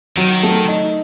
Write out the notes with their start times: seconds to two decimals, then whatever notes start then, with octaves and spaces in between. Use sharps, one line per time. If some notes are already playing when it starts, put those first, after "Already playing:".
0.17 D#3 F#3
0.43 A3
0.68 D#4